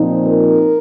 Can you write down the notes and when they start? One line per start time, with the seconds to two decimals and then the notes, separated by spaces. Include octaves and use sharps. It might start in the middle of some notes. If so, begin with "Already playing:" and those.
Already playing: A#2 F3 C4 D#4
0.27 A#4